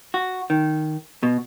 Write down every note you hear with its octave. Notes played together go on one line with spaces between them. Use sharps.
F#4
D#3
B2